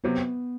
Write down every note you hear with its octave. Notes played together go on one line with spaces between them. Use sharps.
C3 F#3 B3 C4